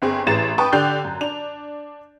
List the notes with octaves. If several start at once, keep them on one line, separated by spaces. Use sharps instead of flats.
G1 C4 G#4
A1 E3 G#4 A#5 A6 E7
B4 G5 A5 C#6 D#6
D3 G4 D5 F#6 G6 C7
F#2
D4 F7